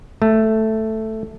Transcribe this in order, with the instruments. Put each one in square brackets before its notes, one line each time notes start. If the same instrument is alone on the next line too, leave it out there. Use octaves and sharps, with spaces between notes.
[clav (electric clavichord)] A3